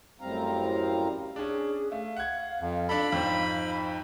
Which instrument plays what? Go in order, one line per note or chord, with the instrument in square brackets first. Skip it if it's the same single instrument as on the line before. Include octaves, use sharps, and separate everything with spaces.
[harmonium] F#2 A2 G3 C4 F5 A#5
[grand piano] C#4 D4 [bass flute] G#4
[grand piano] A3 [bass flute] F5
[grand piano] F#5 G#6
[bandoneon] F2
[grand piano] D4 A4 [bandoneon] B5
[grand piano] F2 G#2 C4